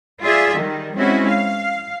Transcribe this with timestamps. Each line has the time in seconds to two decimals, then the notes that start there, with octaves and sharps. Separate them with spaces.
0.21 F4 G#4 D5 E5
0.57 D#3 G3
0.96 G#3 C4 C#4 E4 F#4
1.28 F5